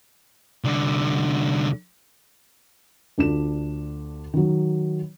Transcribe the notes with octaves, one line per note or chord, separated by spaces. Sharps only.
C2 D3
D2 D4 F4 E7
D#3 F#3